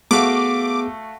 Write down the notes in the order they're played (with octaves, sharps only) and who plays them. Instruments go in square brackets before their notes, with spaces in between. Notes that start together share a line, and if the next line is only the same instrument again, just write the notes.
[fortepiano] A3 F#4 F5 [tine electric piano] B3 G#4 [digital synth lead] D6